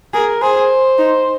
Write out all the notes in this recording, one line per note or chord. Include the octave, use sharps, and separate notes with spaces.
G#4 A#4
G#4 C5
D#4